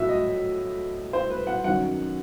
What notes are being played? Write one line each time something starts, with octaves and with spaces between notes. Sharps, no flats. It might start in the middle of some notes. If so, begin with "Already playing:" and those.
Already playing: A2 F#3 F#4 E5
D#5
C5
B4
F#5
F#2 D#3 F#3 F#5